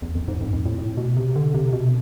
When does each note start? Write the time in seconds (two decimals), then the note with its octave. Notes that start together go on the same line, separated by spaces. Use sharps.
0.02 E2
0.15 F2
0.28 G#2
0.41 F2
0.53 F2
0.66 A2
0.78 A2
0.97 B2
1.17 C3
1.36 D3
1.54 C3
1.73 B2